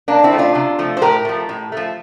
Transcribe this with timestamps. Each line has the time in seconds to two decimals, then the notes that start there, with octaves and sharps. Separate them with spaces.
0.08 C3 A#3 D4
0.24 C4 E4
0.32 F3 A3
0.39 D4 F4
0.55 C3
0.79 F3 A3
0.97 C5
1.02 A2 G4 A#4
1.25 F3 A3
1.49 A2
1.72 F3 A3